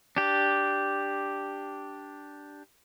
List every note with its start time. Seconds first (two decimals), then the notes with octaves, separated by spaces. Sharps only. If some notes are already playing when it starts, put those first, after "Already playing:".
0.17 D4 G4